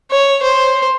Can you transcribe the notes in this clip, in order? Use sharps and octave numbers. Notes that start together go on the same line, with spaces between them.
C#5
C5